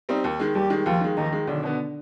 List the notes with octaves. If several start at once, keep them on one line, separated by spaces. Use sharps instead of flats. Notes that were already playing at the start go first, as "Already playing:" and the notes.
G3 C4 D#4
D#2
D#3 G#3
D#2 G3 G4
D#3 G#3
D#2 F3 F4
D#3 G#3
D#2 D#3 D#4
D#3 G#3
B1 D3 D4
B2 B3